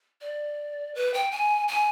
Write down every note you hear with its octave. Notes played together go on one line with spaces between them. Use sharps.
D5
B4
G5
G#5
G#5